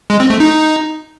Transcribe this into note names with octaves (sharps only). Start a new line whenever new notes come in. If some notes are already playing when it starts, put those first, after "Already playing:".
G#3
C4
A3
D#4